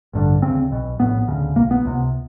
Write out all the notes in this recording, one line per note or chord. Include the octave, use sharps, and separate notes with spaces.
A1 G2 D3
D2 C#3 C4
B1 B2
A#1 A2 B3
D2 C#3
B1 B2 A#3
B3
C#2 C3